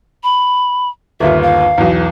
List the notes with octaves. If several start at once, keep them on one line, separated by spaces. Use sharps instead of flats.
B5
G1 D#2 F4 E5
F5
B1 E2